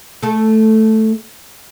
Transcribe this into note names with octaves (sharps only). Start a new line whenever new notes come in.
A3 A4